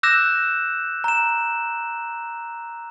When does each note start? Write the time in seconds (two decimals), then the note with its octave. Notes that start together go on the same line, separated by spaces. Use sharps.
0.03 D6 E6 F#6 G6 A#6 E7
1.04 A#5 E7